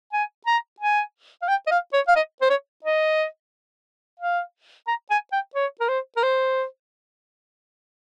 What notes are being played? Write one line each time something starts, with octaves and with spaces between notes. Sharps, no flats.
G#5
A#5
G#5
F5
G5
D#5
F5
C#5
F5
D#5
C5
C#5
D#5
F5
A#5
G#5
G5
C#5
A#4
C5
A#4
C5